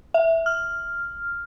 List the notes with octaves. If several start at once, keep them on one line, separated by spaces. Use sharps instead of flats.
E5
F6